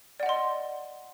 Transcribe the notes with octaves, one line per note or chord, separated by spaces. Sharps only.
D5 D#5 F#5 C6